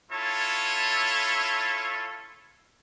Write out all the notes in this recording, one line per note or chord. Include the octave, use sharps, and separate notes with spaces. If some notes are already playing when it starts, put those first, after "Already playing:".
C#4 E4 F4 A4 C#5 A5